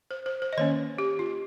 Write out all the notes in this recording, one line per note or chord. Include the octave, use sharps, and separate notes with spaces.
C5
C5
C5
D#5
D#3 A#3 C#4 C#5
G4
F4